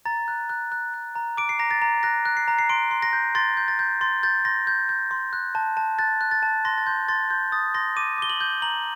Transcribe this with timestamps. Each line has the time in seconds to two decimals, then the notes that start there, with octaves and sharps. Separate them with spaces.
0.05 A#5 A6
0.28 F#6
0.49 F#6
0.72 F#6
0.94 F#6
1.15 A#5
1.37 D6 D7
1.49 C7
1.59 A#5 A#6
1.71 A6
1.82 A#5
2.03 F#6 A#6
2.25 F#6
2.37 C7
2.48 A#5
2.59 C7
2.69 C6 D7
2.91 C6
3.02 A#6
3.13 G6
3.35 C6 A6
3.57 G6
3.68 A6
3.79 G6
4.01 C6 A6
4.23 G6 A6
4.45 C6 A#6
4.67 G6
4.89 G6
5.11 C6
5.33 F#6
5.55 A5
5.77 A5
5.99 F#6 A6
6.21 F#6
6.31 A6
6.43 A5
6.65 C6 A#6
6.78 A6
6.86 C6 G6
7.08 C6 A6
7.30 C6 G6
7.52 D#6 A6
7.74 C6 A#6
7.96 D6 D#7
8.18 D6 G7
8.30 F#7
8.41 G6
8.62 A#5 F#7